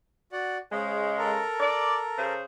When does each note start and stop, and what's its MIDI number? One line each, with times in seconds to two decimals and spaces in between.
0.32 0.58 66
0.32 0.58 74
0.32 0.58 78
0.72 1.40 49
0.72 1.40 56
0.72 1.09 72
1.18 2.33 69
1.18 2.33 70
1.18 2.33 82
1.60 1.96 74
2.17 2.43 49
2.17 2.43 68
2.17 2.43 72